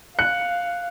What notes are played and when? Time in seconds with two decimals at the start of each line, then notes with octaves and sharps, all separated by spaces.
0.19 F5 F#6 C#7